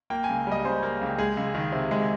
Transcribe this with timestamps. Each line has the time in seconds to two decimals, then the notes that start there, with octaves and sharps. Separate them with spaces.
0.10 A#3 G5
0.24 C#2 G#5
0.47 G3 D#5
0.64 C#3 C5
0.83 A#3
1.01 C#2 G4
1.18 G#3 G#4
1.37 C#2
1.55 D#3
1.72 C3
1.91 G#3